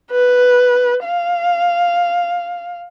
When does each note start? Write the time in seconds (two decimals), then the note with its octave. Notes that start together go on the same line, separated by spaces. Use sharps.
0.11 B4
1.05 F5